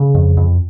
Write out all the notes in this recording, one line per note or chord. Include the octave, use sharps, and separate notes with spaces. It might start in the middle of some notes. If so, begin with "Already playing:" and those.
Already playing: C#3
F2
F2